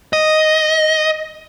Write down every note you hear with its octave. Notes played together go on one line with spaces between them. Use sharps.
D#5